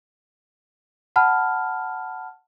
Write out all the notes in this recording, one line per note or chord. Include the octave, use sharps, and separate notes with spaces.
F#5 A5 B5 F6